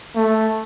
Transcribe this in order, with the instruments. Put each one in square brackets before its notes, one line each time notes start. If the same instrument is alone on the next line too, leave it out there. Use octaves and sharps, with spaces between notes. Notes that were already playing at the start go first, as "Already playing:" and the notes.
[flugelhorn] A3